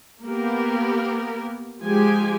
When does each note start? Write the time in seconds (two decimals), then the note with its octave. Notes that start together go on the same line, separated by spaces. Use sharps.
0.22 A#3 B3 G4 A#4
1.80 F3 G#3 G4 G#5